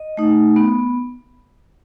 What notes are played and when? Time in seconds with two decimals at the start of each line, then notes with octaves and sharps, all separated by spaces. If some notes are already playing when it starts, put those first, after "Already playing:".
Already playing: D#5
0.17 A3 D#4
0.56 B3